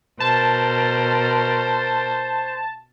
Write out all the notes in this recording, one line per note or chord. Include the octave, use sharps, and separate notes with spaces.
B2 A#4 C5 A5